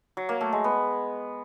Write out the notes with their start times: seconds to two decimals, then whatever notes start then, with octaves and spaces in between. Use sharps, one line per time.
0.17 F#3
0.29 A#3
0.41 A3
0.52 G#3
0.64 B3